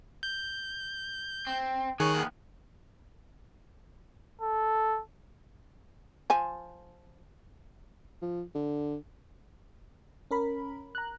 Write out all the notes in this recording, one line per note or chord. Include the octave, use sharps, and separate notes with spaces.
G6
C4
D#3 G#3 G#4 C#5 F#6
D#2 B3
A4
F3 G#5
F3
D3
C#4 A#4 B5
A#5 F#6